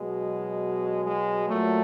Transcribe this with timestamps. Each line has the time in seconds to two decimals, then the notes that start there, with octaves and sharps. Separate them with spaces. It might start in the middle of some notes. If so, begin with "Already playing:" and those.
Already playing: B2 F#3 G#3
1.04 G#3
1.47 A#2 F#3 A3